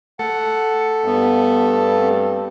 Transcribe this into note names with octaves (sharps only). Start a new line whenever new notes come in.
A3 A4 F#5
G2 B3
C4